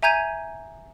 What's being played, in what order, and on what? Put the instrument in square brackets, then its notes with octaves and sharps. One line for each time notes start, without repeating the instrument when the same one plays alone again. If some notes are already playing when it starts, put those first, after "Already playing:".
[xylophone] E5 G#5 A#5 G6 G#6 D#7